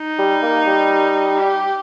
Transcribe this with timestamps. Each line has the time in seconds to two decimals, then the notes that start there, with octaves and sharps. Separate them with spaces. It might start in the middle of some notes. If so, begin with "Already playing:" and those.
Already playing: D#4
0.19 G3
0.43 A#3
0.67 G3
1.39 G4